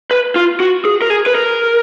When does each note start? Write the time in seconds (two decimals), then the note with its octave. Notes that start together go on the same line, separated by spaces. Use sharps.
0.11 B4
0.36 F4
0.60 F#4
0.85 G#4
1.02 A#4
1.10 G#4
1.26 B4
1.35 A#4